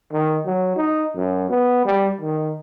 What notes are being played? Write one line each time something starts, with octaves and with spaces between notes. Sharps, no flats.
D#3
F#3
D#4
F#2
B3
G3
D#3